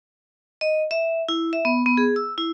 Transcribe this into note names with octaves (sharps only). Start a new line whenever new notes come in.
D#5
E5
E4
E5
B3
B3
G#4
E6
E4